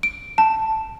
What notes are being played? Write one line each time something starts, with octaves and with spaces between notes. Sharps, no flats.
D7
A5